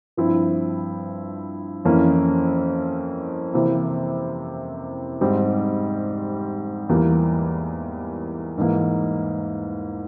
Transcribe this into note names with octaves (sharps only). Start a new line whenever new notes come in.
G2 F3 C4 E4
F2 E3 A#3 C#4 E4
C3 E3 A#3 E4
G#2 G3 C4
E2 E3 G3 A#3
G#2 E3 A#3